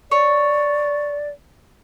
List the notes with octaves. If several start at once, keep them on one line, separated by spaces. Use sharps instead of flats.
C#5 D5